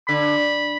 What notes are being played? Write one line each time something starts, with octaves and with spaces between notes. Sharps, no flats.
D3 B5